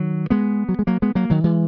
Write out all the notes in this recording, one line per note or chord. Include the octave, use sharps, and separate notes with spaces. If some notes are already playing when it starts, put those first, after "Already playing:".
Already playing: D#3 F#3
G#3 B3
F#3
G#3
F#3 A#3
G#3 B3
F#3 A#3
D#3 F#3
E3 G#3